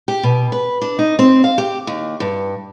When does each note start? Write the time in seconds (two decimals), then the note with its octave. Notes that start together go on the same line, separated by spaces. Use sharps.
0.08 G4
0.23 B2
0.52 B4
0.82 D4
0.99 D#4
1.19 C4
1.44 F5
1.58 G4
1.87 D#2
2.20 G2